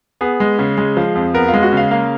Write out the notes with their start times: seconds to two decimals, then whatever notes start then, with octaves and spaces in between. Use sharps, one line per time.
0.21 B3 G#4
0.40 G#3
0.59 C#3
0.78 G#3
0.97 F3
1.15 F2
1.34 B3 A#4
1.48 F4
1.54 G#3
1.63 F#4
1.72 C#3 F5
1.91 A#3 F5